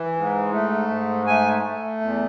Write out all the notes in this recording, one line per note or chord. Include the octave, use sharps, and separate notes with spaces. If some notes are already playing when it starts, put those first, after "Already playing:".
Already playing: E3
G#2
A3
G#2
A3 G#5
A3
E2